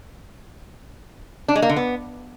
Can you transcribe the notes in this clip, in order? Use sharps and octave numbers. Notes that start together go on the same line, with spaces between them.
D4
G#3
A#3
D3
B3